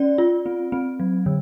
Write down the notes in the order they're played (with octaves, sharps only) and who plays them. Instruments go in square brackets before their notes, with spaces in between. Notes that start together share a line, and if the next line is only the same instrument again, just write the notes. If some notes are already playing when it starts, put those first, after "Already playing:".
Already playing: [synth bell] C#4 D5
F4
C4
C4
F#3
D3